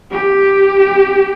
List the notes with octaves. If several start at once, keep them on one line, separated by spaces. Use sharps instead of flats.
G4